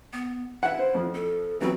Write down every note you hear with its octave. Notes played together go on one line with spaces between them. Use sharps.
B3
E4 E5 F#5
C5
F2 F3
A4
E3 F#3 B3 C4